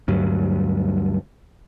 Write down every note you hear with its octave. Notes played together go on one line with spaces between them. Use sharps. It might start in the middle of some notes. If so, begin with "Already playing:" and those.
D2 G2 F#3 G3